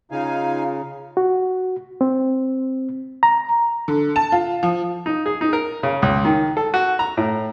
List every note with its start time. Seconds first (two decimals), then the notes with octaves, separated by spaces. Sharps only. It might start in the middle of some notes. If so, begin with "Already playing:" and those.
0.11 C#3 D#4 F4 F5 G#5
1.17 F#4
2.01 C4
3.23 A#5
3.88 D3
4.16 A5
4.32 F4
4.63 F3
5.06 D#4
5.26 G#4
5.41 D#4
5.53 A#4
5.83 C#3
6.02 C#2
6.25 D#3
6.57 A4
6.74 F#4
6.99 A#5
7.17 A2